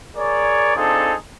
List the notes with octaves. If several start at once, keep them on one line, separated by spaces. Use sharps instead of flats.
G#4 A#4 C#5 D5
C4 D4 D#4 F4 G#4 A4